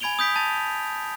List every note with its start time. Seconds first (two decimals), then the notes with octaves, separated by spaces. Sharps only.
0.01 G#5 B5 G#6 D7 F7 G7
0.19 D#6 G6 B6 D7
0.36 A5 A6 F7